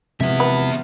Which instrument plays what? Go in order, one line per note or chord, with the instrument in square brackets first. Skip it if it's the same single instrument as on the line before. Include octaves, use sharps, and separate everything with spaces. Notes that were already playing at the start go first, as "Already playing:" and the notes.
[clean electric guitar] C3 F3 G#3 [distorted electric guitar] B3 E5
[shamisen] B4